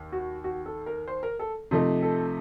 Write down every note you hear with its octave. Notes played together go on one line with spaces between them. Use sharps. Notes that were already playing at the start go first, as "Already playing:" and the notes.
Already playing: D#2
F#4
F#4
A4
A#4
C5
A#4
A4
C3 F3 A3 D#4
A4